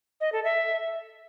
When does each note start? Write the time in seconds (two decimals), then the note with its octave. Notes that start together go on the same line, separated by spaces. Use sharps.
0.21 D#5
0.32 A4
0.44 E5